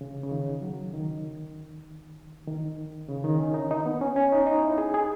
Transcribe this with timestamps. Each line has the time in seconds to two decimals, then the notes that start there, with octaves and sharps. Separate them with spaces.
0.01 C#3
0.23 C#3
0.31 D#3
0.61 F#3
0.93 D#3
2.47 D#3
3.09 C#3
3.24 D#3
3.39 C#4
3.54 D#4
3.71 D#4
3.86 B3
4.01 C#4
4.16 C#4
4.32 D#4
4.47 D#4
4.62 E4
4.78 G#4
4.94 G#4